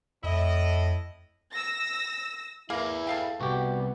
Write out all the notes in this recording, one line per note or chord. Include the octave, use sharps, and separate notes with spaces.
F2 A2 E4 D#5
E6 A#6
A#3 E4 G#4 A#4 B4
A4 F5 G5
C2 B3 F#4 G4